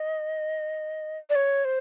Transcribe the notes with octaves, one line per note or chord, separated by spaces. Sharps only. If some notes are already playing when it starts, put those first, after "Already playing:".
Already playing: D#5
D5
C#5
C5